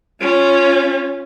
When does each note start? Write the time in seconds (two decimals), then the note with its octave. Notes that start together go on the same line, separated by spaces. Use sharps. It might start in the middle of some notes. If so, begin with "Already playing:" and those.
0.21 C#4 F4